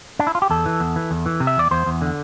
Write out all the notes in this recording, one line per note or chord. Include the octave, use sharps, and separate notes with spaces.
D4
E4
F4
G4
E2 A4
E3
E2
E3
E2
E3
C3
E5
E2 D5
E2 C5
E2
D3